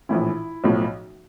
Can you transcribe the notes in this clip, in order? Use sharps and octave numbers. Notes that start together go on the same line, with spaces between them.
A#1 A2 E3 E4
B1 A2 F3